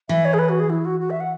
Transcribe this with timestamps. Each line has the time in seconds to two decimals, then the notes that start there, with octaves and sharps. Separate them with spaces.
0.09 E3 E5
0.25 C#5
0.34 G#4
0.39 B4
0.49 F#4
0.60 G#4
0.70 E4
0.85 F#4
1.00 F#4
1.10 E5
1.20 F#5